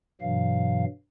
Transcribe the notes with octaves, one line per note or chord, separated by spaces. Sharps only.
G2 B2 E3 F#3 F5